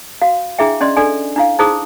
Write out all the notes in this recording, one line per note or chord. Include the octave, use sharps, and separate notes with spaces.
F#4 F5
D4 E4 G#4 E5 G5
C#4 D5 D#5 C6
D4 A4 D5 G#5
D4 E4 F5
D#4 E4 G#4 C5 D#6